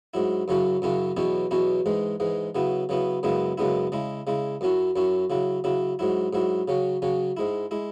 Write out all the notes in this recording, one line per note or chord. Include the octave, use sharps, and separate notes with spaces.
G#2 F#3 E4
F#2 C#3 F#3 C#4 E4
F#2 C#3 F#3 C#4 E4
E2 B2 F#3 C#4 E4
E2 B2 F#3 C#4 E4
G#2 E3 G#3
G#2 E3 G#3
C#3 F#3 B3 E4
C#3 F#3 B3 E4
F#2 C#3 G#3 B3 E4
F#2 C#3 G#3 B3 E4
C#3 G#3 E4
C#3 G#3 E4
F#2 F#3 C#4 E4
F#2 F#3 C#4 E4
C#3 F#3 E4
C#3 F#3 E4
G#2 F#3 E4
G#2 F#3 E4
C#3 F#3 C#4
C#3 F#3 C#4
G#2 G#3 E4
G#3 E4